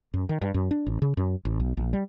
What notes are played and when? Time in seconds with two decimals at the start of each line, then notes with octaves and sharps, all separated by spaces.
0.14 F#2
0.29 D#3
0.42 G2
0.54 F#2
0.71 D4
0.86 A1
1.02 C#3
1.17 F#2
1.45 A1
1.60 B1
1.77 A#1
1.93 G3